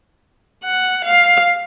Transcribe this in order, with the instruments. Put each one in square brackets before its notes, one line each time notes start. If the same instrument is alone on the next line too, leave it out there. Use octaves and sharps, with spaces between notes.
[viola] F#5
F5